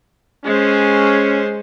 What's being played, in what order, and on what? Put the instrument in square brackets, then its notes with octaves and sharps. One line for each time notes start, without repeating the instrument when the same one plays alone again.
[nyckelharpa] G#3 C5 [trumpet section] C#4